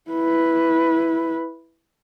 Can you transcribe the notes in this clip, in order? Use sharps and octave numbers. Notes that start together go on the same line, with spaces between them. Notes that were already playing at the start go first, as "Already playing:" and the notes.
E4 B4